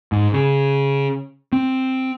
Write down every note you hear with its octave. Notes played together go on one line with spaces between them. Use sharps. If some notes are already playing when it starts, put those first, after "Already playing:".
G#2
C#3
C4